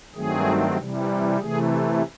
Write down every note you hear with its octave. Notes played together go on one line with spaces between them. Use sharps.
G2 D#3 F#3 A3 C4 G#4
C3 E3 G3
C3 E3 A3 G#4